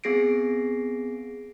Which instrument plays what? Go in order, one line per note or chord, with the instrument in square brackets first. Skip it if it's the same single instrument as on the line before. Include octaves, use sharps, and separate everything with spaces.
[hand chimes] B3 C4 G#4 A#6 C7 D7